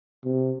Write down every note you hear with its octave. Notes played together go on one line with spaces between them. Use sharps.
C3